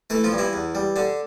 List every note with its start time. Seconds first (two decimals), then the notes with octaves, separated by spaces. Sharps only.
0.10 E3 A3 A4
0.24 F3 F4
0.32 G2
0.38 E3 E4
0.53 E2
0.75 G3
0.96 D3 D4